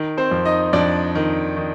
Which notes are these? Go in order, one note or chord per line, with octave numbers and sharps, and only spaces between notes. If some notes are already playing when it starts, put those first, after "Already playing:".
Already playing: D#3
C4 C5
F2
D#4 D#5
F2 D4 D5
D#3
D#3